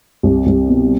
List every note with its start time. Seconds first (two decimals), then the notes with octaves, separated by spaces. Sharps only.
0.23 C2
0.46 C2
0.69 B2